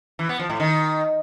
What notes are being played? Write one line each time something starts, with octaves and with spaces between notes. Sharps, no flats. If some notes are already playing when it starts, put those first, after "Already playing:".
E3
B3
F3
A2
D#3